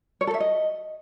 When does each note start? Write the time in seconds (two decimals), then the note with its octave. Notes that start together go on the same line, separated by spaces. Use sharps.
0.21 C#5
0.27 A4
0.34 E5
0.40 D#5